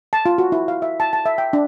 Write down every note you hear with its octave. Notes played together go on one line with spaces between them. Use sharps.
A5
F4
F#4
E4
F5
E5
A5
A5
E5
G5
D4